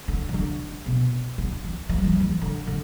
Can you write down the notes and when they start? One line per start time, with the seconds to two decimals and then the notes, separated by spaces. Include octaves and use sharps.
0.08 D3
0.29 E3
0.34 D3
0.86 B2
1.38 D3
1.64 E3
1.89 E3
1.97 G3
2.04 E3
2.12 G3
2.20 E3
2.41 D3
2.67 D3